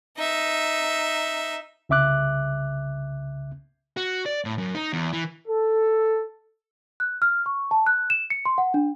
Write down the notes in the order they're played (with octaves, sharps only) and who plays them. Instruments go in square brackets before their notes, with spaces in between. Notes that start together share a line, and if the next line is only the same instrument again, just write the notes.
[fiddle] D#4 E5
[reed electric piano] C2 C#3 E5 D6 F#6
[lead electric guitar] F#4
D5
A2
F#2
D#4
E2
E3
[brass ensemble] A4
[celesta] F#6
F6
C#6
A5
F#6
E7
C#7
C6
F#5
D4